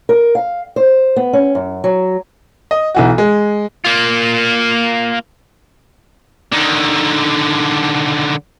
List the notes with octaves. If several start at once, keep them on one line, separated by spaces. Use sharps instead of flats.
A#4
F5
C5
B3
C#4
F#2
F#3
D#5
B1 E3 F#4
G#3
A#3 F4
D3 D#3